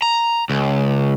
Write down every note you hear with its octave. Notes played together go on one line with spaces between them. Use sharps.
A#5
C#2